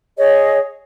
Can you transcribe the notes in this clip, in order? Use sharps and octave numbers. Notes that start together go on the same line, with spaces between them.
G#4 C#5 D#5